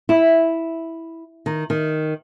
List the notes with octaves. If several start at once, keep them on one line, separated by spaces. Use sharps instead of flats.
E4
D#3
D#3